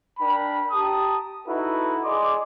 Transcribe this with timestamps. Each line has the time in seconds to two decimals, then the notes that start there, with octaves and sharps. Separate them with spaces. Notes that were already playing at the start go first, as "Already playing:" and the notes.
0.20 D4 A#4 G5 B5
0.72 G4 A5 A#5 D#6
1.47 D#4 E4 F#4 A4 B4
2.04 G#4 D5 D#5 C6 D6